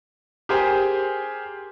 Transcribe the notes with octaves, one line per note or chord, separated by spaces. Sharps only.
G4 G#4 A#4 C5 G5 G#5